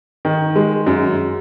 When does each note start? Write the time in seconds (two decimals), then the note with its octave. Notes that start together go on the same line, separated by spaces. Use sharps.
0.25 D#3
0.56 G#3
0.87 F#2